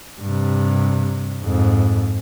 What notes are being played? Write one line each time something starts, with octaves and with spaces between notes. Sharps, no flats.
G2 C3
F2 G#2